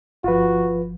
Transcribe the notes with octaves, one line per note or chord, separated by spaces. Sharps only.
G1 F3 F4 F#4 B4